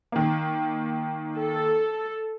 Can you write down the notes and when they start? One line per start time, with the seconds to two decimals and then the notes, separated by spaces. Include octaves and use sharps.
0.12 D#3 A#3
1.37 A4